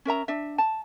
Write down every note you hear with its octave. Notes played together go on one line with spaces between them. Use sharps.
C#4 A#4 E5 A#5
D4 E5
A5